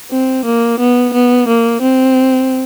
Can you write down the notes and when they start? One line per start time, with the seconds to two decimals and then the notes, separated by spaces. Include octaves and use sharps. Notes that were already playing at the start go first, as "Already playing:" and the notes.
0.11 C4
0.46 A#3
0.80 B3
1.14 B3
1.48 A#3
1.82 C4